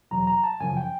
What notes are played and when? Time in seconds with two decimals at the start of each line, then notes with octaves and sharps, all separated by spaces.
0.11 E2 B2 F#3 A#5
0.27 A#5
0.44 A5
0.60 F#2 C#3 F3 G#5
0.77 G5